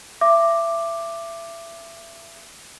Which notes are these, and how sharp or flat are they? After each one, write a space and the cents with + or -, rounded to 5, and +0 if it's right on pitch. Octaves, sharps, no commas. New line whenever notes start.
E5 +25 D6 +5